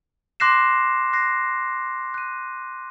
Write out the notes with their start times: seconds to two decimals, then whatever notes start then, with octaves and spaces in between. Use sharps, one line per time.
0.40 C6 D6 F#6 A#6 C7 E7
1.13 F#6 A#6 C7
2.14 F#6 D#7